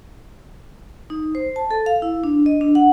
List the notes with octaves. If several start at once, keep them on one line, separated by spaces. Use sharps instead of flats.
D#4
C5
A5
A4
F5
E4
D4
D#5
D4
F#5